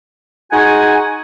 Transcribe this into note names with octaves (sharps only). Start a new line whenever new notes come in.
G#3 D#4 F#4 F#5 G#5